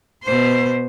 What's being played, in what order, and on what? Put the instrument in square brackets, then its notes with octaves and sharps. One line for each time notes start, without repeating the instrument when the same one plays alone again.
[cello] B2 C5